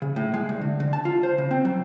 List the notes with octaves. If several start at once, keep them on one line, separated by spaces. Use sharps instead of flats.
C#3
A2
G#3
C2
D3
D3
A5
F4
C5
C#3
C4
F#3